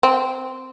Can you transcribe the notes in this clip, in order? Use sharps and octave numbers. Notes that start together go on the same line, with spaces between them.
C4